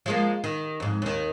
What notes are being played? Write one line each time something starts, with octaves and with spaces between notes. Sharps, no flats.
F3 G#3 A#3
D#3
F2 G#2
D#2 D#3